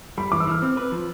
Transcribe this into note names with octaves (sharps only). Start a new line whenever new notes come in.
G3 B5
E3 D6
E6
E3 F6
C4
B4
F3